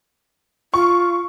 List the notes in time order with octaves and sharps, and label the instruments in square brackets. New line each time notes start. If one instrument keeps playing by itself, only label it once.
[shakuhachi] F4 [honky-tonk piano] C#6